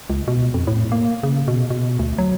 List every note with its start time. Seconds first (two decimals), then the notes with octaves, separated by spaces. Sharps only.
0.10 C#2
0.28 B2
0.54 F2
0.67 A2
0.92 A#3
1.23 C#3
1.48 B2
1.70 B2
1.99 D2
2.18 F#3